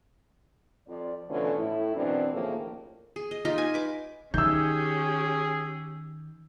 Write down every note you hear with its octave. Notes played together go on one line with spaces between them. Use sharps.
F2 D5
B2 D3 E3 F3 A3 C#4
A2 E4
F#2 B2 E3 C4 D4
D#2 A2 C#3 F3 A#3
G#4
D#5
D#4 F4 G4 D#5
G#5
B4 D6
D#3 C#4 G4 G#4 E6 G6